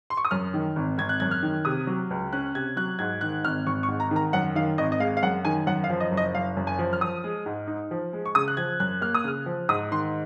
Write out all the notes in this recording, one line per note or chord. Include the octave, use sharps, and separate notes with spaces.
C6
C#6
D#6
F#2 F6
D#3
G#1
G#1 G#6
F#6
F#2 G#6
F6
D#3
C3 D#6
F#3
C#2
C#4 F#6
C3 G#6
F#3 F#6
G#2 G#6
D#3 F#6
G#1 F6
G#1 C#6
C#6
G#2
A#5
D#3 A#5
F#2 F#5
D#3 F5
G#1 D#5
D#5
G#3 F5
F5
F#2 F#5
D#3 G#5
F#2 F#5
F5
F3
D#5
F#1
D#5
F#1 F5
F#2
G#5
F3
F6
F3 D#6
G#3
G#2
D#4
F3
G#3
C#6
C#3 D#6
F#6
F3 G#6
F#2 F#6
A#3 F6
D#6
C#3 F6
F3
G#2 D#6
D#3 C6